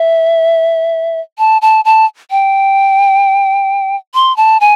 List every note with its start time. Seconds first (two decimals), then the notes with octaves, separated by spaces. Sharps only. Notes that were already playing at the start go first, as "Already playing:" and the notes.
Already playing: E5
1.38 A5
1.62 A5
1.85 A5
2.31 G5
4.14 C6
4.37 A5
4.61 G#5